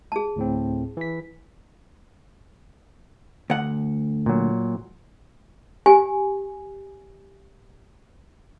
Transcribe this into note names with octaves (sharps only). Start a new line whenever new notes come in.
G#4 A5
D2 A2 C4
E3 B6
D2 F#5
A#2 F#3
G4 G#5